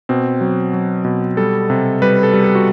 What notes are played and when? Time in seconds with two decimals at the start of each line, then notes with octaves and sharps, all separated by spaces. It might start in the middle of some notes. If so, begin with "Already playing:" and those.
0.09 B2 C4
0.41 F#3
0.73 F#3
1.05 B2
1.37 G3 A4
1.70 C3
2.02 G3 B4
2.23 A4
2.34 G3
2.44 A4
2.55 F#4